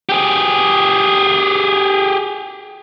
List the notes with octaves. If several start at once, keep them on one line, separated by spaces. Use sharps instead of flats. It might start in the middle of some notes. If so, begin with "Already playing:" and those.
G4 G#4